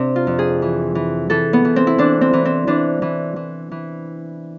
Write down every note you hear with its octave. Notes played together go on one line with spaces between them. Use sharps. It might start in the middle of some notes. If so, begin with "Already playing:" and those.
Already playing: C3 C4 D4
F4
F2
G#4
E3
E3
E3 A4
B3
E3
C4
E4
E3 D4
C4
E3
C4
E3 D4
E3
E3
E3